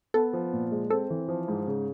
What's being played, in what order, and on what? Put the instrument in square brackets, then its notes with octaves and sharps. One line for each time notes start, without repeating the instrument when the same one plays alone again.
[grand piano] B3 [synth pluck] A4
[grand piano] F3
A#2
G#3
[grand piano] C4 [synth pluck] A4
[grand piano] E3
F3
G#2
C#3